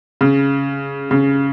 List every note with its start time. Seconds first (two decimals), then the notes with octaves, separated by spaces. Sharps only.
0.21 C#3
1.11 C#3